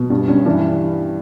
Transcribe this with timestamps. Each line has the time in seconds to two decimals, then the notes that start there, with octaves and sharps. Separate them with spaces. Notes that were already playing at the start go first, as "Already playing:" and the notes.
Already playing: B2
0.10 G2
0.28 G2 C#4
0.46 E3 D4